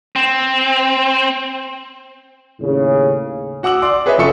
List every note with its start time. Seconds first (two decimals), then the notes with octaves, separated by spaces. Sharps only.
0.16 C4
2.60 D#2 A2 C#3
3.63 F#4 F#5 D6 E6 F#7
3.82 D5 C6 D6
4.06 G#4 B4 C#5 D#5 E5
4.18 F#1 C#4 F4 A4 C#6 C#7